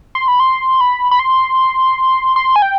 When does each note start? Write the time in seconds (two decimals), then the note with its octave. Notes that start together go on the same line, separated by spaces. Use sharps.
0.15 C6
0.28 B5
0.40 C6
0.81 B5
1.11 B5
1.19 C6
2.36 C6
2.56 G#5
2.62 G5